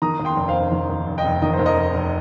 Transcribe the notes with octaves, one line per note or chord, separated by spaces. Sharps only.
D#3 A#5 D#6
D#2
G5 C6
F1
C5 F5
F1
D#3
D#2
F1
D#5 G5
F1
D#3 D#5
C5
D#2
A#4 D#5
F1
F1